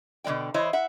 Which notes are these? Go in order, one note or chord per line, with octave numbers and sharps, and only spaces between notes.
B2 D3 G#3 D5 G5
E3 E4 C5 C#5 D#5
E5 F#5